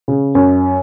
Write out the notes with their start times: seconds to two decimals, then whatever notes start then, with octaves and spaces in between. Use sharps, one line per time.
0.08 C#3
0.35 F#2